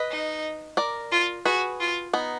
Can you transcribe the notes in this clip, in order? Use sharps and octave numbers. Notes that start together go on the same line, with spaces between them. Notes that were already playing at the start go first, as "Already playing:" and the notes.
Already playing: B4 D#5
D#4
A#4 D5
F4
F#4 G#4 B4
F4
B3 D#4